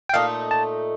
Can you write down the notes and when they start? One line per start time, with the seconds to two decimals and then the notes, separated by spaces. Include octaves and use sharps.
0.09 G5
0.14 A#2 A3 D#4 F5
0.51 A5